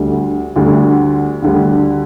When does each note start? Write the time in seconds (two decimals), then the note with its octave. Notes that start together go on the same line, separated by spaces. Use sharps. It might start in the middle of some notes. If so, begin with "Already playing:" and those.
Already playing: D2 D3 G3
0.56 D2 D3 G3
1.42 D2 D3 G3